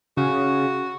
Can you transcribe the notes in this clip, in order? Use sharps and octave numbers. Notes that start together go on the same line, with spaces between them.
C#3 F#4